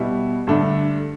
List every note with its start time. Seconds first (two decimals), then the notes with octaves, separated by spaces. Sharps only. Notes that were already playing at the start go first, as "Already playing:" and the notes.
Already playing: B2 G3 B3 E4
0.47 G2 D3 A3 D4